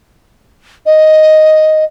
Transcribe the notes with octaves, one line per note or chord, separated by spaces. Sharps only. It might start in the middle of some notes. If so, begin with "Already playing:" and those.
D#5